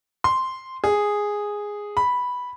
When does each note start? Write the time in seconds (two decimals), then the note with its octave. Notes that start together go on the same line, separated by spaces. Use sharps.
0.24 C6
0.84 G#4
1.97 B5